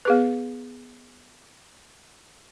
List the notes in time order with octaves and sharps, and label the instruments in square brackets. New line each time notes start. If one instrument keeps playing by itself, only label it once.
[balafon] B3 G#4 B4